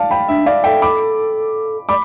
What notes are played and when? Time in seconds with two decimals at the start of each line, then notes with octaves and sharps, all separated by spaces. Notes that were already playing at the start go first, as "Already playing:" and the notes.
Already playing: D5 F5 A5
0.11 G5 B5
0.28 D4 E5
0.46 D5 F5
0.64 A4 E5 G5
0.82 B5 D6
1.89 D5 B5 D6